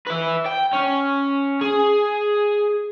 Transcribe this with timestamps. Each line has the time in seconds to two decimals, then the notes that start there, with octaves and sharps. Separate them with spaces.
0.07 B4 E5
0.46 G5
0.73 C#4
1.61 G#4